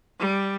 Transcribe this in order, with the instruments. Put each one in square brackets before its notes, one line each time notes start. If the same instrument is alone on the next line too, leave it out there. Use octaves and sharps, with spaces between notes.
[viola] G3